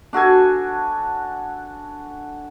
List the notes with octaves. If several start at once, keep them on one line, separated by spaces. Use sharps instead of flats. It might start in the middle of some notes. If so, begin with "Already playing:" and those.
D4 F#4 A4 G#5